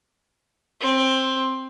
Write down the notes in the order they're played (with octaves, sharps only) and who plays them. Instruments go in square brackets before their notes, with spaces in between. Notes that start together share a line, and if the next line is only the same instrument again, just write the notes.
[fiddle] C4